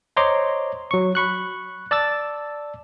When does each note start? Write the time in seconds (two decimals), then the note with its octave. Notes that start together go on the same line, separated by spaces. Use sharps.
0.17 C5 C#5 D#5 A#5 C6 D6
0.91 F#3 C#6
1.15 B5 C#6 F#6
1.91 D5 A5 E6 A6